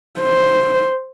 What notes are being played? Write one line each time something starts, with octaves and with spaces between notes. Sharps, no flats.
C5